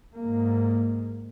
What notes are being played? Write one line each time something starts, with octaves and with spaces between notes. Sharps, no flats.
G#2 A#3